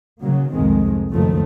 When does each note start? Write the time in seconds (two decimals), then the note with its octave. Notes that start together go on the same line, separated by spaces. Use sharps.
0.21 C#3 F#3 A#3
0.52 C2 F2 D#3 G#3 C4
1.13 F#1 C2 D#3 F3 A3